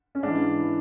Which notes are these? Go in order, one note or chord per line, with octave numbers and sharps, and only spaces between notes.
C#4
G#2 E3 D4
E3